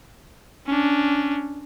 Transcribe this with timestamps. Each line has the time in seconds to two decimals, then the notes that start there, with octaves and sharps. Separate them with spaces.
0.67 C#4 D4